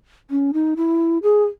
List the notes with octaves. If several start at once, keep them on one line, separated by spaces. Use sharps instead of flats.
C#4
D#4
E4
G#4